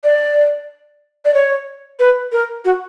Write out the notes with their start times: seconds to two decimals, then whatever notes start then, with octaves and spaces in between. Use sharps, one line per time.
0.04 D5
1.25 D5
1.34 C#5
1.99 B4
2.32 A#4
2.65 F#4